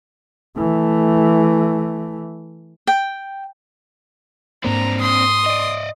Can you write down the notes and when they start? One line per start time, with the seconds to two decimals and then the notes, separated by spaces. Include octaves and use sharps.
0.57 E3 A3
2.87 G5
4.64 G#2 A#3 C4 D4 A#5
5.01 C6 D#6
5.46 D5 D#5